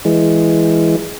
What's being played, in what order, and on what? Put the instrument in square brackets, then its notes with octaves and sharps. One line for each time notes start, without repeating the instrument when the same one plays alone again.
[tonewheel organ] E3 G#3